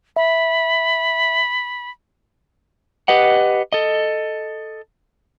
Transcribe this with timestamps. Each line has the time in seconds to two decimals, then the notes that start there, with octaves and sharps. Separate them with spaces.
0.16 E5 B5
3.08 G4 B4 D#5 F#5
3.73 A4 D#5